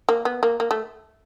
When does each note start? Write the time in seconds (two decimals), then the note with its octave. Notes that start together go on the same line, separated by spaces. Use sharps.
0.09 A#3
0.25 B3
0.43 A#3
0.60 A#3
0.71 A3